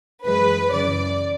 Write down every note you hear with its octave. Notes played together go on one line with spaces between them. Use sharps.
F#2 E3 G#3 B4
F#2 C#3 E3 D5